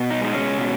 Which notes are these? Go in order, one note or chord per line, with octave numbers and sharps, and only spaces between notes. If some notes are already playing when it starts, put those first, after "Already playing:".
Already playing: B2
D#4
G#3 D#4
C#4
B2